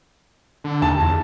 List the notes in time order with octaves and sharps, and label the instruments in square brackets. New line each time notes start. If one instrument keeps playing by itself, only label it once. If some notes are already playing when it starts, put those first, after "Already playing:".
[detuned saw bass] D3
[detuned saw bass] D#2 [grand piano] A5
[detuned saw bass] E2